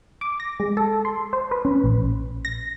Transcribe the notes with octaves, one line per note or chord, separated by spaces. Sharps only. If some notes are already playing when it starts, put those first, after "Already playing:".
D6
A#6
G#3
A4
C6
C5
B4
C#4
A#1
A#6